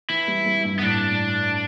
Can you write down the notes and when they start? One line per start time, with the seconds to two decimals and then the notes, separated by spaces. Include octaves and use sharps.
0.09 E3 E4
0.28 G3
0.46 G3
0.65 G2
0.79 B3
0.83 A2 D4